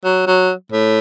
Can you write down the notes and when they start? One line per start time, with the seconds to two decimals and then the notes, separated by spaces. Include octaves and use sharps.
0.04 F#3
0.27 F#3
0.72 A2